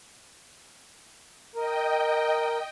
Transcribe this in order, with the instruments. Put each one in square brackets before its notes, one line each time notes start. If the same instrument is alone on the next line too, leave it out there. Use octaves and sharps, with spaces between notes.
[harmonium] A#4 [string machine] D#5 G5